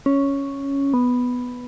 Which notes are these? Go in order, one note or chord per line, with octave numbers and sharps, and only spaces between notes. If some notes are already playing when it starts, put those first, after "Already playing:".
C#4
B3